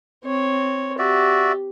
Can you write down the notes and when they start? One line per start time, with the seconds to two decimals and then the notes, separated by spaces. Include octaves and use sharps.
0.24 C4 C#5
0.98 F#4 G4 D5 E5